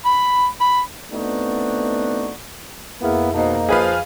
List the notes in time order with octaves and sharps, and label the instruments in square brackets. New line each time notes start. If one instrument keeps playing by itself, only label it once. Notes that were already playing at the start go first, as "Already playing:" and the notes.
[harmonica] B5
B5
[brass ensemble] A3 B3 C4 D4 D#4 F#4
[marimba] F2 G#4 F6 [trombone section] A#3 B3 E4
[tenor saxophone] B2 [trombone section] A#3 D#4 [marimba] C5 D#5 A5
[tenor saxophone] F3 [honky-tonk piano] G#4 B4 F5